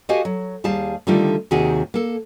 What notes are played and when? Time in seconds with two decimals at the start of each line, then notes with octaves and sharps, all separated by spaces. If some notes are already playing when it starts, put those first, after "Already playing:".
0.09 F#4 G4 A4 D#5 F5 G#5
0.25 F#3
0.64 D#2 G3 G#4 F5 A5
1.07 D3 D#3 G3 A3 F4
1.51 D#2 C3 D#3 F#4 G#4
1.94 A#3 A4